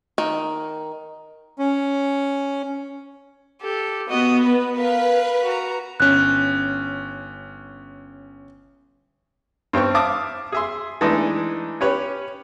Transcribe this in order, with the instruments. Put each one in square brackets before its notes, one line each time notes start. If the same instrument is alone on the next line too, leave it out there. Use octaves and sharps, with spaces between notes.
[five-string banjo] D#3
[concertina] C#4
[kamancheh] G4 A4
[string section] B3 [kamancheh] F#4 D#5
[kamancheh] B4
[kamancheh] A#4 F5 [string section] B4
[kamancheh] F#4 A#5
[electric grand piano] G1 C#4 [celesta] F#6
[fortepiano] G2 C4 G5 C#6
E5 F5 A5 D6 D#6
G#4 E5 C6
E3 G#3 A3 D4 D#4
C#4 G4 B4 C#5